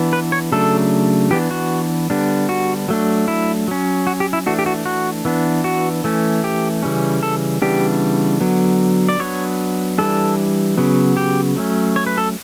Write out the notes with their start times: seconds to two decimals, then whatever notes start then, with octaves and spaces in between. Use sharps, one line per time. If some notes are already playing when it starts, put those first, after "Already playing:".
Already playing: E3 B3 D4
0.13 B4
0.32 C#5
0.52 C#3 F#3 A3 D4 A4
1.31 E3 B3 D4 G4
1.51 F#4
2.10 D3 G3 B3 D4
2.49 F#4
2.88 F#3 A3 D4
3.28 E4
3.68 F#3 C#4
4.07 F#4
4.20 G4
4.33 E4
4.46 E3 A3 D4 F#4
4.59 G4
4.66 F#4
4.86 F#4
5.25 E3 B3 D4
5.64 F#4
6.04 E3 A3 C#4
6.44 G4
6.83 C#3 E3 G3 C#4
7.23 A4
7.62 C#3 E3 G3 B3 D4 G4
8.41 D3 F#3 B3
9.09 D5
9.19 F#3 B3 D4 C#5
9.98 E3 G3 D4 A4
10.78 C#3 F#3 B3
11.17 G4
11.56 F#3 A3 C#4
11.96 C#5
12.06 B4
12.18 A4